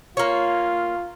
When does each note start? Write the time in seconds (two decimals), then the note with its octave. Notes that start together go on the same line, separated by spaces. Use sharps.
0.17 A#3 F4 C#5